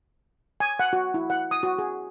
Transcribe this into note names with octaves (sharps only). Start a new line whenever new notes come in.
G#5
F#5
F#4
E4
F#5
D#6
F#4
G#4